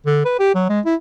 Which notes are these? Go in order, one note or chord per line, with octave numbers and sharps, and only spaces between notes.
D3
B4
G4
F#3
G#3
E4